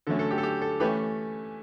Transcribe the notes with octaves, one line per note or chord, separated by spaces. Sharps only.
D3 F#3 A3 C#4 A4
A4
G4
A4
G4
A4
E3 A3 C#4 G4 B4